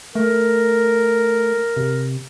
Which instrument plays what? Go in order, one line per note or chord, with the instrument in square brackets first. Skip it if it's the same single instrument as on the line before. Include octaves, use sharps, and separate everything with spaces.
[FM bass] A3 [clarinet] A#4
[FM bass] C3